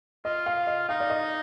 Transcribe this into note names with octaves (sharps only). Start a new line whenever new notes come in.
F4 D#5
F5
D#5
D#4 F5
D5
D#5